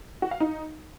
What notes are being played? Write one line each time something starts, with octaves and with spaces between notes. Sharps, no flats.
F#4
F5
D#4